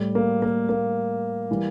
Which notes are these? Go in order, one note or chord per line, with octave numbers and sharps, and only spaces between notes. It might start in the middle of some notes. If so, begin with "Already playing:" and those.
Already playing: A2 G3
A#3
A#3
A#3
E3 G3